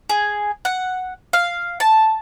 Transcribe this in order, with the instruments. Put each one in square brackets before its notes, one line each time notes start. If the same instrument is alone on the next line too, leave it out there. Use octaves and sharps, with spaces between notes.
[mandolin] G#4
F#5
F5
A5